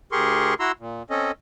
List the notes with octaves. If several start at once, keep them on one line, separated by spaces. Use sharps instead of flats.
D2 G4 G#4 A#4 C6 C#6
E4 F#4 A#5 C6 E6
A#2
C4 C#4 A4 D#5